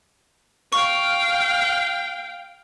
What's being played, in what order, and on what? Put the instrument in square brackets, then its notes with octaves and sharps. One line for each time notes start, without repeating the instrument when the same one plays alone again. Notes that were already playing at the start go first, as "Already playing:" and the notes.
[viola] F5 G5 [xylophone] C#6